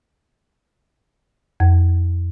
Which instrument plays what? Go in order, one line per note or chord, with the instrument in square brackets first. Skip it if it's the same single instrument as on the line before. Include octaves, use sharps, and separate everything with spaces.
[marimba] F2